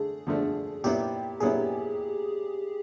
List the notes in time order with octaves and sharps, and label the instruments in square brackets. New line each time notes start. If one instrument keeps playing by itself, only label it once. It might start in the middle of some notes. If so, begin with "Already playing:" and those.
Already playing: [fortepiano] D3 A3 [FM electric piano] G#4
[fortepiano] D3 F3 A3
[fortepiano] A#2 F#3 B3 E4 [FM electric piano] G4
[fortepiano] A#2 F#3 B3 E4 [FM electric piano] G#4